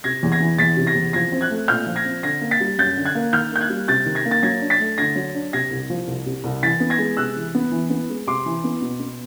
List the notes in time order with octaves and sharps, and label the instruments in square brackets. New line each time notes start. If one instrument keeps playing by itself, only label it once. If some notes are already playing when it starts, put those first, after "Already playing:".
[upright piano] C3 G#6 A#6
E2
G#6 A#6
E3
E2 A6 B6
C3
G#6 A#6
E2
F3 G#6 A#6
C4
F#6 G#6
A3
A#2 F6 G6
F3
G#6 A#6
C4
D3 G#6 A#6
A#3
A6 B6
G3
F#2 G6 A6
D3
F#6 G#6
A#3
D#3 F6 G6
A#3 G6
F#6 G#6
G3
C3 G6 A6
D#3
G#6 A#6
A#3
A6
F#3 G#6 A#6
D4
A6 B6
A3
D3 G#6 A#6
F#3
D4
C3 G#6 A#6
C2
F3
C2
C3
C2
E3 A6 B6
B3
G#6 A#6
G#3
C3 E6 F#6
E3
B3
E3
B3
G#3
C3 C6 D6
E3
B3
B2
B3